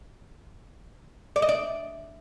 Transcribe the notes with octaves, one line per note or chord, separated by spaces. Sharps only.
D5
D#5
D5